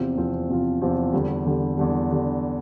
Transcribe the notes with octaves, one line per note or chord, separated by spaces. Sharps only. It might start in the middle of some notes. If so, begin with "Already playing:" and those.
Already playing: E2 C3 F3 C4 F4
E2 C3 F3 C4 F4
E2 C3 F3 C4 F4
E2 C3 F3 C4 F4
E2 D3 G3
E2 D3 G3
E2 D3 G3
D3 G3